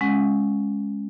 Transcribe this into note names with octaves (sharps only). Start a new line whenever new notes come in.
G#3 C#4 F#5